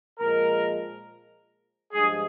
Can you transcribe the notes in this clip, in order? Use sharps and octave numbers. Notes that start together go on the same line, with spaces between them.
A#2 F3 G#3 A#4
G2 F3 G#3 G#4